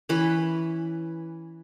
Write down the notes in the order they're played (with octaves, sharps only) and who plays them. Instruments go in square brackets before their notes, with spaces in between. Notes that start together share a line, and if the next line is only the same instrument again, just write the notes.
[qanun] E3 C#4 B4 B5